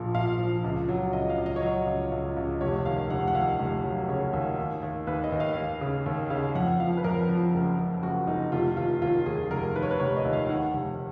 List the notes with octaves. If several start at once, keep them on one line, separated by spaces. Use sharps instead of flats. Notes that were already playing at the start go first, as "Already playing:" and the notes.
Already playing: A#1 A#2
A#2 F5
F3
C#2
F#3
C#2 D#5
F5
C#2
D#5
C#5
F#3 D#5
C#2
C#2
C#2
F1 C#5
D#2 F5
F1 F#5
F#5
D#2 F5
F1
F#3
C#3 C#5
D#2
D#2
D#2
D#2 B4
D#5
D#2
F5
D#2
C#3
D#2
C#3 F5
F2 F#5
F3 F5
B4
F2 A#4
F3
F#1
F#1
F#1 F#4
F#1 D#4
F1 F4
D#2 F4
D#2 F4
D#2 G#4
F1 A#4
D#3 B4
C#5
B4
F1 C#5
D#5
D#2
F5
D#3 F#5
F1